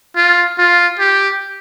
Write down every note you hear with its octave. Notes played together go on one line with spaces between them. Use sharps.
F4
F4
G4